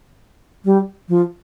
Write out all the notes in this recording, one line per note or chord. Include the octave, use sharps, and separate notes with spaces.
G3
F3